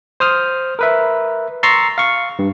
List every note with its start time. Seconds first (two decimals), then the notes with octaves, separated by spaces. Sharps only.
0.20 C5 D#6 F6
0.79 A#4 B4 E5
1.63 A#5 C6 C#6 E6 A6 C7
1.98 F5 C#6
2.39 G2